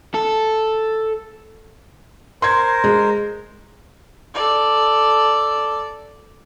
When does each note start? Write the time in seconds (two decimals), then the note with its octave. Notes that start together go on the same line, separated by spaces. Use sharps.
0.14 A4
2.42 A#4 C5 C6 G#6
2.84 G#3
4.35 A4 D5